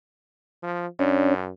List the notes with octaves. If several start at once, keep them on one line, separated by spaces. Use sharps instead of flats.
F3
F#2 C#4 D4